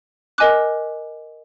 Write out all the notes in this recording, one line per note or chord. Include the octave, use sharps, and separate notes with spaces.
A#4 D#5 G#5 D6 F#6